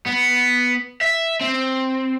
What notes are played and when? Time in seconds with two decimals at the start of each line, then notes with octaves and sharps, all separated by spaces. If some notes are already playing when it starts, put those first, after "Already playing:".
0.06 B3
1.01 E5
1.41 C4